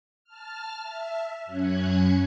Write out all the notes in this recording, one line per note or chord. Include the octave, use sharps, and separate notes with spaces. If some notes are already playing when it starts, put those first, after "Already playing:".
A5 F6
E5
F#2 F#3 C#4 F#6 G#6